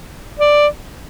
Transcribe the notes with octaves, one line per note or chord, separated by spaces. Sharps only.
D5